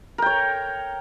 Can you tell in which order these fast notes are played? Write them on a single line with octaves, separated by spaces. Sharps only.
A#4 G5 C#5